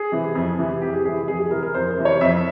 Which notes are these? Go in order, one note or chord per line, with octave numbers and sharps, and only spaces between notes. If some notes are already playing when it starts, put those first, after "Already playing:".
Already playing: G#4
C3 E3
F2
C3 E3
F2 G4
G#4
C3 E3 G#4
F2 G#4
G#4
C3 E3 A#4
A#4
F2 C5
C5
C3 E3
C#5
F2 E5